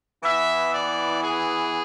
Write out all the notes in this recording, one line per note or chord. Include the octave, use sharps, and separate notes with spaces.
E3 B3 E4 E5
D5
G#4